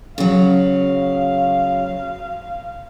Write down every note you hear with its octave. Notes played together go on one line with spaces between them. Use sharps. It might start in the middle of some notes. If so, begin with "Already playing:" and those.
C#3 F#3 F5